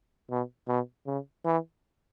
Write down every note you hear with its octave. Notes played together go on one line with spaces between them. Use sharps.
B2
B2
C#3
E3